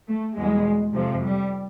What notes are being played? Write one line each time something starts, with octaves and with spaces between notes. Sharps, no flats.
A3
E2 B2 G3 G#3
F2 C3 F3
G3